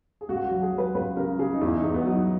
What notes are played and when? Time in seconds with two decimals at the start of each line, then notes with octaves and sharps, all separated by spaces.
0.21 G#4
0.29 C#2 F#4
0.45 F#4
0.51 F#3
0.62 G#4
0.73 F#3
0.78 B4
0.95 C#2 B4
1.17 C#3 A#4
1.39 C#3 G#4
1.53 D#4
1.61 E2 E4
1.77 D#4
1.83 E2
1.94 B3
2.05 F#3
2.11 D#4